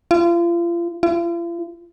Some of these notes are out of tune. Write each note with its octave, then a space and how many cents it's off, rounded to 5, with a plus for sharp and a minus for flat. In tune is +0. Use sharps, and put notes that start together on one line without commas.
F4 -35
F4 -45